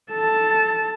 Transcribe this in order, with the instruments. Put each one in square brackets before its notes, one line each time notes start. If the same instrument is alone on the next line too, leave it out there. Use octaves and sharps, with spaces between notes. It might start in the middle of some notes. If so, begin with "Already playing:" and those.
[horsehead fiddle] A4 A5